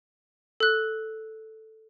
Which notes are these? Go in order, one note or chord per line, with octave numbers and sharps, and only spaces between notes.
A4 F#6